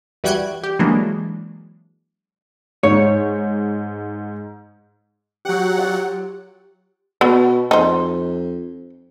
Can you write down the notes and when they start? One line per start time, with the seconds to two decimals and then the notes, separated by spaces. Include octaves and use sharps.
0.24 E3 G3 F#4 G5 F#6 G#6
0.63 G4
0.79 E3 F#3 G#3 A#3 D4
2.83 G#2 C#5
5.45 F#3 G4 F#5
5.78 F4 F5
7.21 B2 B3
7.71 F2 D#4 C5